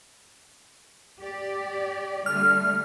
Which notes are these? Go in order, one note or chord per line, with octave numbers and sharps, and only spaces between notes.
G4 D5
D3 G3 A3 F6